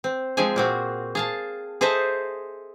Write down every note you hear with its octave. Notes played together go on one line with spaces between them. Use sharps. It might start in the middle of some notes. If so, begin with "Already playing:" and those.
C4
F3 G#3 C4 G#4 G#5
A#2 C4 F#4
G#4 F5 A5
G#4 A4 C5 D#5 E5 A5